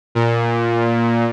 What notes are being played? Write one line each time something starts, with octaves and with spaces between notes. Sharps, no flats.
A#2